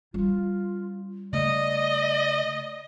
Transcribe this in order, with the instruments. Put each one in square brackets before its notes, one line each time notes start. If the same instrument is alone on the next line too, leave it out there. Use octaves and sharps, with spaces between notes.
[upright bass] G3 C#4 [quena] F4
[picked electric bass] C#3 A3 [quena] D5 [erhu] D#5